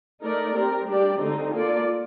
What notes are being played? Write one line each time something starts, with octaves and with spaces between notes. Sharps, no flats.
A3 D#4 A#4 D5
C4 G4 A#4
G3 D4 G4 D5
D3 A3 C4 D#4
A#3 F4 A4 D5